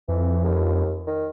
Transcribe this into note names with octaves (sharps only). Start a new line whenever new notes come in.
F2 E3
D#2
D#3